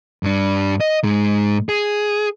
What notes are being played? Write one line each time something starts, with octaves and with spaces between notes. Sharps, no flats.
G2 D4
D#5
G#2 G#3
G#4